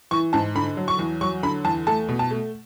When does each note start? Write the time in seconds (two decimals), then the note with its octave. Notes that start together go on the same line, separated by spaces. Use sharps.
0.11 E3 C#6
0.33 G#2 A5
0.55 D3 B5
0.77 F#3
0.88 C#6
0.99 E2
1.21 F#3 C#6
1.43 D3 B5
1.65 E2 A5
1.87 A3 A5
2.09 B2
2.19 A5
2.31 A3